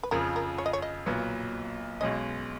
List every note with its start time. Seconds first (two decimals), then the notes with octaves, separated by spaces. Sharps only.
0.03 B4
0.11 F2 C#3 F3 A#4
0.36 A#4
0.58 C#5
0.66 D#5
0.73 C#5
0.82 D#5
1.06 B1 A#2 F#3 B3
2.01 B1 B2 G#3 C#4 D#5